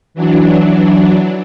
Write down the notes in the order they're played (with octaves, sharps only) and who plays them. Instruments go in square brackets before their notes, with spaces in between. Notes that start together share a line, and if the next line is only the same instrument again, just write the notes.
[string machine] E3 F#3 D4